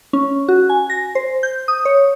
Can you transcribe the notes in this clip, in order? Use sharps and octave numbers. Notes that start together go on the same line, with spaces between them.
C#4
F#4
G#5
A#6
C5
G6
D#6
C#5